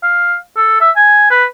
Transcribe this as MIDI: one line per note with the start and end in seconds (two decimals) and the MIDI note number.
0.03 0.36 77
0.57 0.77 69
0.81 0.91 76
0.96 1.31 80
1.31 1.45 71